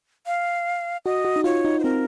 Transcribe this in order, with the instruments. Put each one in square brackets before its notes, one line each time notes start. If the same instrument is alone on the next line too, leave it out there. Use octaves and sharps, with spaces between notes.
[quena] F5
[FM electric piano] F#4 [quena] D#5
[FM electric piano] F#4
D#4
[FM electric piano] F4 [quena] C#5
[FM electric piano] D#4
[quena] C5
[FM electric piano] C4 [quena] A#4